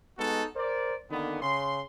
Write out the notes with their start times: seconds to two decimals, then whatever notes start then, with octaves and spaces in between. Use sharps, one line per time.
0.18 G#3 B3 D#4 F#4 A4
0.56 A#4 C5 D5
1.11 D3 D#3 A#3 B3
1.42 C#3 C6